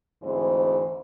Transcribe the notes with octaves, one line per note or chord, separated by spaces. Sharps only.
D2 G#2 E3 G#3 C4 C5